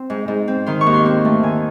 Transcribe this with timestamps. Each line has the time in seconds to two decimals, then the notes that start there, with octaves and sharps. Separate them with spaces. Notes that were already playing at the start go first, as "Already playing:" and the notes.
Already playing: C4 C6
0.10 G#2
0.28 G#2
0.48 C4
0.66 D#3 C6
0.81 C#6
0.86 D#2
0.94 C6
1.06 C4
1.25 A3
1.43 D#3 G#5